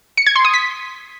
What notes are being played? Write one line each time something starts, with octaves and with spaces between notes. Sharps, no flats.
C#7
G#6
C6
D#6
B6